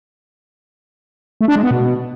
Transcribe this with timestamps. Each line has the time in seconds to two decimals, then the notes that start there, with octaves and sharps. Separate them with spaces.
1.41 A3
1.48 D4
1.56 G#3
1.63 B3
1.71 B2